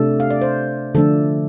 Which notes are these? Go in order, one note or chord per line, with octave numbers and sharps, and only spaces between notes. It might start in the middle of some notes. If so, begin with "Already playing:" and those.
Already playing: C3 A3 D4 A4
F5
D5
C5
D3 F3 A3 D4 A4